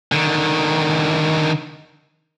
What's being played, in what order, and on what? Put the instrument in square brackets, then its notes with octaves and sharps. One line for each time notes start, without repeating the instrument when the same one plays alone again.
[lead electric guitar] D3 D#3